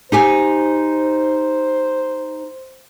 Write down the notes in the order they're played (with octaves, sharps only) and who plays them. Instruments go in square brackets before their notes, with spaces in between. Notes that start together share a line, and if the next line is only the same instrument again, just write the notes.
[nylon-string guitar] D#4 G4 G#5 [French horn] C5